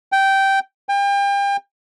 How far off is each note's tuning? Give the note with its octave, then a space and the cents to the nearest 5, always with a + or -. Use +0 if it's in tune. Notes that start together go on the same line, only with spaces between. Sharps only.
G5 -10
G5 +35